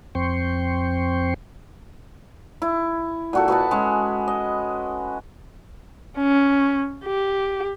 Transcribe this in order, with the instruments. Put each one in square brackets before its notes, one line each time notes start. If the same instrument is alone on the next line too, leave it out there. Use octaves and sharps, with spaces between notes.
[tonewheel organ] F2 C4 G5 C6 C#6
[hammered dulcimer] E4
A#2 F#4 A4
F#4 B4 D#5 A5
G#3 C#4
D#5
[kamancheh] C#4
G4